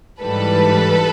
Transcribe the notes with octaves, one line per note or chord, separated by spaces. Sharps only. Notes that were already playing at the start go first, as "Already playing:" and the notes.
G#2 E3 G3 A4 B4